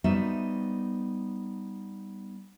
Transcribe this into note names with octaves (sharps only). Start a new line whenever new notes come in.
G3 B3 D#4 F#4 C5 E5